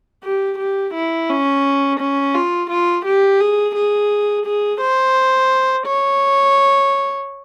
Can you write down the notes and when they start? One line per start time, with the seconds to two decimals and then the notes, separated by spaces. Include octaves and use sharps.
0.24 G4
0.59 G4
0.94 E4
1.29 C#4
2.00 C#4
2.35 F4
2.70 F4
3.06 G4
3.40 G#4
3.75 G#4
4.46 G#4
4.81 C5
5.87 C#5